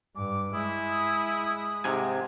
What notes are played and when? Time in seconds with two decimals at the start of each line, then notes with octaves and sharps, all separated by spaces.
0.16 G2 D6
0.53 G#3 E4 D#6
1.84 G#2 C3 G#5